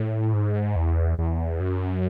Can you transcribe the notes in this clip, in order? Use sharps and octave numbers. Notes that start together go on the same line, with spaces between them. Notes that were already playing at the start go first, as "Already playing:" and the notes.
Already playing: A2
G#2
E2
E2
F#2